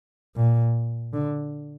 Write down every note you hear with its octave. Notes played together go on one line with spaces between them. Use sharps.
A#2
D3